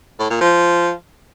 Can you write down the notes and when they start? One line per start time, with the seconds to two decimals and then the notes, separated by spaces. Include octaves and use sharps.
0.20 A2
0.30 A#2
0.41 F3